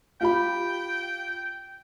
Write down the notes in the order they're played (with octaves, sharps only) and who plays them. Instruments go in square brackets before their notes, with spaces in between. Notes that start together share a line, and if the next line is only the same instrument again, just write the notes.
[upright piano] F4 G4 B5 [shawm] G5